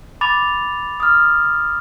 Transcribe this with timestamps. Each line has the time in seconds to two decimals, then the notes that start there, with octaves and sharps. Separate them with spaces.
0.21 B5 D6 A6 F7
1.00 D#6 F6